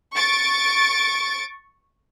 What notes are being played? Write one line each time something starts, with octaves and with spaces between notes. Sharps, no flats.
C#6 A6 D7